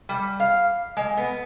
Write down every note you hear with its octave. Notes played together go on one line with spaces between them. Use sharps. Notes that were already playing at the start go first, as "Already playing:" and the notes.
G3
F5
G#3
B3